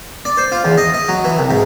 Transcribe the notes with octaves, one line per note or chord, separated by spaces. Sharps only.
D5
C5
F4
E2
D#5
D#5
F#3
E3
C2
G#2